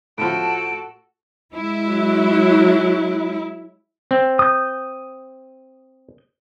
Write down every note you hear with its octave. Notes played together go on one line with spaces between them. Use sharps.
A2 F3 F#4 A4 D7
G#3 E4
F#3
C4
D#6 G6